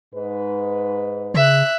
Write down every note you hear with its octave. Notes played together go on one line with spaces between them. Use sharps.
G#2 B4
C#3 E5 F#6